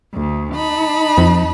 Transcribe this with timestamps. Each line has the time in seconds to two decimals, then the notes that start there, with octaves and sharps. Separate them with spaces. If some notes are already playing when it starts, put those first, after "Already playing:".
0.13 D2
0.53 D#4 A5 B5
1.18 F2